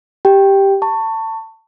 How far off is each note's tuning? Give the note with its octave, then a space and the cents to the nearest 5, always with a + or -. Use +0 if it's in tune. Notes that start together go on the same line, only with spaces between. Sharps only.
G4 +0 G5 +0
A5 +25 C#6 +0